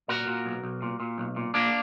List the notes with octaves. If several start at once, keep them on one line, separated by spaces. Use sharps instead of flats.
A#2 F#4 A#4
A#2
B1
B1
A#2
A#2
B1
A#2
A#2 A#3 D4